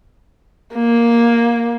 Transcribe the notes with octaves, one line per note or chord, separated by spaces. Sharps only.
A#3